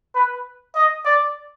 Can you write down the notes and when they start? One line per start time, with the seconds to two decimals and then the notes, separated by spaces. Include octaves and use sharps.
0.15 B4
0.75 D#5
1.05 D5